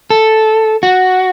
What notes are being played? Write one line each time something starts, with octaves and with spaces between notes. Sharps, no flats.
A4
F#4